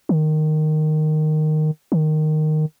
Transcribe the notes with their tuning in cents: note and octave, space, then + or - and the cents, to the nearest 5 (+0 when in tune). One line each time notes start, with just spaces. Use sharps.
D#3 -10
D#3 -10